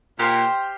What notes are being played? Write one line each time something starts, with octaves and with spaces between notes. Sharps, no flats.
A#2 G4 C5 F5